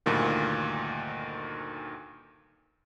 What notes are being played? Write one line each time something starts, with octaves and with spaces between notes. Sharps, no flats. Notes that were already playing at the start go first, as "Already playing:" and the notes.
D2 G2 A#2 D#3